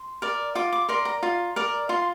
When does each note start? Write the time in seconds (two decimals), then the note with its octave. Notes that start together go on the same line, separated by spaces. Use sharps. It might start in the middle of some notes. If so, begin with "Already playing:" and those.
Already playing: C6
0.22 A#4 D5
0.55 F4 D6
0.72 D6
0.89 A#4 D5 C6
1.05 A#5
1.23 F4
1.56 A#4 D5
1.89 F4 C6